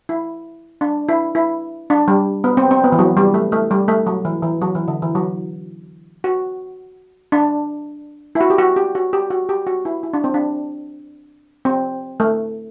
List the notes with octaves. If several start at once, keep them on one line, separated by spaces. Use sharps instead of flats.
E4
D4
E4
E4
D4
G3
B3
C4
C4
B3
E3
F#3
G3
A3
A3
G3
A3
F#3
E3
E3
F#3
E3
D3
E3
F#3
F#4
D4
E4
F#4
G4
F#4
G4
F#4
G4
F#4
G4
F#4
E4
E4
D4
C4
D4
C4
A3